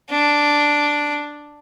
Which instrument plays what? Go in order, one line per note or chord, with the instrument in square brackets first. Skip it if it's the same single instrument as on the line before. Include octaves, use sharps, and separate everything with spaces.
[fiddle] D4